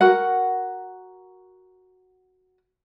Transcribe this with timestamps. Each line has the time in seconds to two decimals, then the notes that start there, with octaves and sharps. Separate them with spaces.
0.01 F#4 A#4 F#5